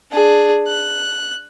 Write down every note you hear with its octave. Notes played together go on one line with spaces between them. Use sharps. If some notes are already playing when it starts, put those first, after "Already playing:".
D4 G#4
F#6